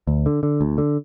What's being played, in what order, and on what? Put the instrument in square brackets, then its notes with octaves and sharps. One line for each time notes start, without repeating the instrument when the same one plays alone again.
[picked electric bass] D2
D3
D3
D2
D3